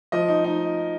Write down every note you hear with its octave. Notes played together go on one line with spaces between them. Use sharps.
F3 D#5
D#4
D#4